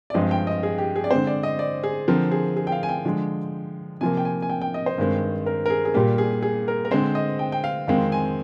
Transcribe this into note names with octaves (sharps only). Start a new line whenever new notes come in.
D5
G2 F3 G#3 C4 D#5
G5
D#5
G#4
G4
G#4
D5
D3 G#3 C4 C5
D5
D#5
D5
G#4
D3 F3 C4 A#4
G#4
G#4
G5
F5
G#5
G5
D3 F3 G#3
C3 F3 A#3 G#5
G5
G#5
G#5
G5
G5
D#5
C5
G2 D#3 G#3 C4
A#4
A#4
G#4
G#4
A#2 G3 A#3 G4
G#4
G#4
A#4
A#4
D3 G#3 C4 C5
D#5
G5
G5
F5
F2 D#3 G#3 C4 F5
G#5